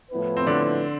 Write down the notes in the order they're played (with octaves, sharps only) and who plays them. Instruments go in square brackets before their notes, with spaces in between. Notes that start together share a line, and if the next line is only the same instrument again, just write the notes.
[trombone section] A2 F3 B3 E4 B4
[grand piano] C4
D3 D4